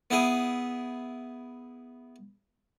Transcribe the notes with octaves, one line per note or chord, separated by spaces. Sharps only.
B3 E4 G#4